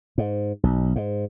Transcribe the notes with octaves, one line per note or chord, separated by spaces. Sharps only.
G#2
B1
G#2